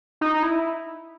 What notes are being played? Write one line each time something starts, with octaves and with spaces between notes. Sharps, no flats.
D#4
E4